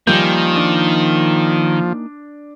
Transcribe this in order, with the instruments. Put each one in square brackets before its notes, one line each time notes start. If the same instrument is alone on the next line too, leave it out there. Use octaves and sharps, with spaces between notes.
[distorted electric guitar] D#3 [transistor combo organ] F3 [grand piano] G3 G6 [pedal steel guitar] A#3 D#4 G#5
[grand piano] D4